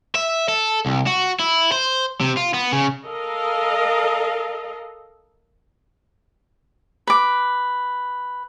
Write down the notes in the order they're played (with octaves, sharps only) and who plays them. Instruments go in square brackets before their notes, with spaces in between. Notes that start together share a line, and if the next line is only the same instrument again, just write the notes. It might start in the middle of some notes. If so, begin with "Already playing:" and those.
[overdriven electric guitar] E5
A4
C2
F#4
E4
C5
C3
F4
B3
C#3
[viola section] A4 A#4 D#5 F5
[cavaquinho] B4 D6